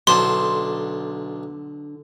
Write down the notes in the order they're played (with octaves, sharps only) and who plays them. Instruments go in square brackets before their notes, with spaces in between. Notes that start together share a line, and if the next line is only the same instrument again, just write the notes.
[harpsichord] B1 D4 C5 [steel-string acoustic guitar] D3 [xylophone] C6